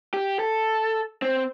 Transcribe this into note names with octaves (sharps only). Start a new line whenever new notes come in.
G4
A4
C4